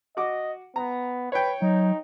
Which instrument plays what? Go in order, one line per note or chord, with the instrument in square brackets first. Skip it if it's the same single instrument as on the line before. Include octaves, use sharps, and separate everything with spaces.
[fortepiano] F#4 D6 [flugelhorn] D#5
[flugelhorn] B3 [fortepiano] A#5
[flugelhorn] B4 [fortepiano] C#5 G5
[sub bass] F#3 [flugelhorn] D#4